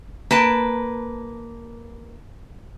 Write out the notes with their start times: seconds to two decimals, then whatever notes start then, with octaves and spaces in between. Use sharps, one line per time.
0.31 A#3 B4 A5